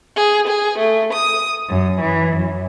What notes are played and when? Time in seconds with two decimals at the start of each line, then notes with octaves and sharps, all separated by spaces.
0.17 G#4
0.47 G#4
0.79 A3
1.13 D#6
1.69 F#2
2.01 E3
2.36 F#2